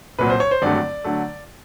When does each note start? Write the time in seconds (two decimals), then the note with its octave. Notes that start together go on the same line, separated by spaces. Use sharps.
0.19 C2 A#2 F#3 B4
0.30 C5
0.40 C#5
0.51 C5
0.62 G#1 G2 D3 F#3 A3 D5
1.04 D3 F#3 A3